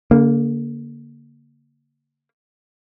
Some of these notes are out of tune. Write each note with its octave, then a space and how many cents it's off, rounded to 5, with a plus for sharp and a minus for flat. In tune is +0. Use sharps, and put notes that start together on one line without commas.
D3 -45 A#3 +0